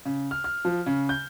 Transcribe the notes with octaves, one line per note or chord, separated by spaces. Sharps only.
C#3
F6
F6
F3
C#3
G6